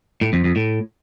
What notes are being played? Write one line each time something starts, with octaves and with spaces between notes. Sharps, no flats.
A2
F2
F2
A2